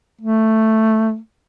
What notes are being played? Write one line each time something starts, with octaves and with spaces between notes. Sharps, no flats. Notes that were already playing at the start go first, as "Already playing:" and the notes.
A3